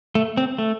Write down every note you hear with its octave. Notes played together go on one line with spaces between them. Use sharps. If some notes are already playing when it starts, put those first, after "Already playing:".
A3
C4
A3